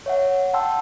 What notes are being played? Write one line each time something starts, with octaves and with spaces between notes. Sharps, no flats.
C#5 E5 F#5
F#5 G5 A5 C6 E6